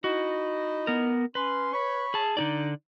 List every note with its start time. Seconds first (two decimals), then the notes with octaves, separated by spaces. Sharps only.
0.04 D#4 E4 F#4 D#5
0.87 B3 A#4
1.35 C#4 B4 C6
1.73 C#5 B5 C#6
2.14 G#4 A5
2.37 D3 D#4 G#4 D5